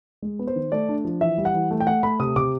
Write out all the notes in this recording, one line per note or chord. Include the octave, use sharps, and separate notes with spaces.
G#3
B3
C5
D#3
A3 D5
D4
F3
E3 E5
G3
F#5
E3
A3
G5
A3 F#5
A3 B5
C3 D#6
C3 D6